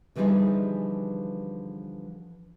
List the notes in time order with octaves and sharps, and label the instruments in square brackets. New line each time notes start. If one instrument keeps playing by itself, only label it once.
[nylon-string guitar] D3 E3 F3 G3 D#4 G#4